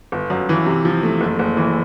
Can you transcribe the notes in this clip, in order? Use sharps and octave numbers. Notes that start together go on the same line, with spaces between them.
G1
F#2
E3
C3
F3
A3
F#1
F#1
E3